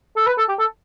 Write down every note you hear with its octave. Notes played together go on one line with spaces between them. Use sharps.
A4
B4
A4
G4
A4